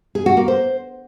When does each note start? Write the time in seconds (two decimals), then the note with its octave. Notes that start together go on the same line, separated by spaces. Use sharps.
0.15 G#4
0.26 F#4
0.37 A#3
0.48 C5